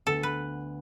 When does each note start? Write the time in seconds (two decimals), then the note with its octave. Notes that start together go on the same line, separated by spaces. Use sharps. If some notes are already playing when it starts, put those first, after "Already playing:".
0.06 D2 D3 B3 A4
0.23 B4